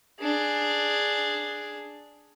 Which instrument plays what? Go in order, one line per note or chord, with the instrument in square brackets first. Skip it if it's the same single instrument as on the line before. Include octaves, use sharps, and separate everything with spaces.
[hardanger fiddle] D4 G#4